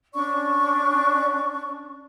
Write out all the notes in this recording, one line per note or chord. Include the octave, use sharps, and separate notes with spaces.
C#4 D4 D5 C#6